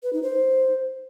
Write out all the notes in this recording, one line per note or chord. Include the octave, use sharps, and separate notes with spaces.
B4
D#4
C5